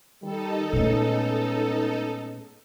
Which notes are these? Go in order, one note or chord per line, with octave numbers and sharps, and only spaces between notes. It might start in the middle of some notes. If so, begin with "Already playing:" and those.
D#3 G3 D#4 A4
A#2 G#3 A3 B3 C#4